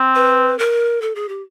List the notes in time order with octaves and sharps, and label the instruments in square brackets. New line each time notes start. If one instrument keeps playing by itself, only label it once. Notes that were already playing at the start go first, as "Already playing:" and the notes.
Already playing: [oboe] C4
[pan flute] B4
A#4
A4
G#4
G4